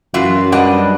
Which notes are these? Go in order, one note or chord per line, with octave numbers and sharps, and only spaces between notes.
F#2 E3 F4 F#4
G3 D4 B4 D#5 F#5